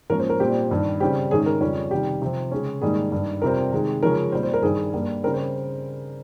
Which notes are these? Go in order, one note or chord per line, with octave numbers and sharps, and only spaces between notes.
G#2 F3 A#3 C#4 A#4
C5
A#4
A#2 G3 C4 G4
G2 D#3 G3
C#3 G3 C4 G4
G#2 D#3 G#3 C#4 G#4
A#4
F2 C#3 G3 C#4
C3 D#3 G3 G4
C3 F3 C4
C#3 G#3 C#4
G#2 D#3 G3 A#3 G#4
G2 D#3 G3
F2 C3 G3 C4 A#4
C3 D#3 G#3
C#3 F3 G#3 C#4 A#4
A#2 G3 C4 C5
C5
A#4
G2 D#3 G3 G#4
G2 G3 A#3
C#3 G3 C4 A#4
C5